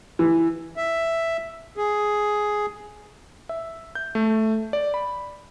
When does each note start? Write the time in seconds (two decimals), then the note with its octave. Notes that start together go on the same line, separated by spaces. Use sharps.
0.19 E3
0.77 E5
1.77 G#4
3.49 E5
3.95 G6
4.15 A3
4.73 D5
4.94 B5